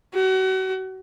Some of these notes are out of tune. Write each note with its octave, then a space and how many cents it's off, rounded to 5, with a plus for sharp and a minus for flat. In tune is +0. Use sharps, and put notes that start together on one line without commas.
F#4 +35